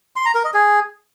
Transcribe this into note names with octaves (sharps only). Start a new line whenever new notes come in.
C6
A#5
A#4
D#5
G#4